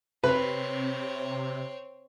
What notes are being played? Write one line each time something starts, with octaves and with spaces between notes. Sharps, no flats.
C3 C4 B4 C#5